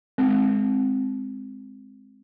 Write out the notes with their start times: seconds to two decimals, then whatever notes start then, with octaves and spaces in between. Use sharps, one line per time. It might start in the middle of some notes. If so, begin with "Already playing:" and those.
0.18 G#3 C4